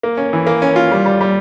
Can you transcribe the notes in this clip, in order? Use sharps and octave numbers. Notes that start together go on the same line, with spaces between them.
A#3
C#4
E3
A#3
C#4
F4
G3
G3
G3